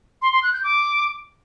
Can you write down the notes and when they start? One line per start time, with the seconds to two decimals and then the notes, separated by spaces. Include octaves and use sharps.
0.22 C6
0.32 C6
0.43 F#6
0.53 G6
0.64 D6